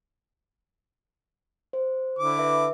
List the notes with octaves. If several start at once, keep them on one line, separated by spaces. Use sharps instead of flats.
C5
D3 E4 D6
B4 E5